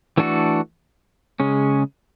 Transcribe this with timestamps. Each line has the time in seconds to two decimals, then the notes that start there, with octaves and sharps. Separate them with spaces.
0.17 E3 A3 D4 F#4 A4
1.40 C#3 G#3 C#4